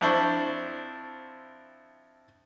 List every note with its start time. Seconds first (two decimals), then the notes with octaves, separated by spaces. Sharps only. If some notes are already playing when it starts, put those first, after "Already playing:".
0.01 F2 C4 D4 E4 C5 C#6